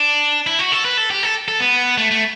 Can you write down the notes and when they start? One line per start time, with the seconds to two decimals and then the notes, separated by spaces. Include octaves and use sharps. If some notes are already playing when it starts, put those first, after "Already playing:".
Already playing: D4
0.47 E4
0.59 F#4
0.72 A4
0.85 B4
0.97 A4
1.11 G4
1.23 A4
1.48 A4
1.60 B3
1.98 A3
2.11 A3